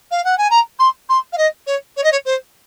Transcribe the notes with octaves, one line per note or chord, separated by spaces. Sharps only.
F5
F#5
G#5
A#5
C6
C6
F5
D#5
C#5
C#5
D#5
C#5
C5